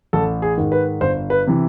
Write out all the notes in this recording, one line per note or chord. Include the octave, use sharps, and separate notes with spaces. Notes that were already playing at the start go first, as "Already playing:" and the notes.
A1 A4
G#4
G#2 D#3
B4
G1 C5
B4
C3 E3